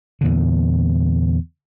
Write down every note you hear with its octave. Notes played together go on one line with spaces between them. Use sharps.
E2 A#2 D3